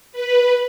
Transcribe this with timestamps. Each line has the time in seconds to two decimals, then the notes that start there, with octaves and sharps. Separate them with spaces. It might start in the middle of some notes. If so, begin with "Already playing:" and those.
0.12 B4